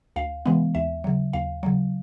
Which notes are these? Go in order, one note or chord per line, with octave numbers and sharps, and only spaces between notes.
D2 F5
C3 E3 G#3 B3
D#2 E5
C#3 F#3
D#2 F5
C#3 F#3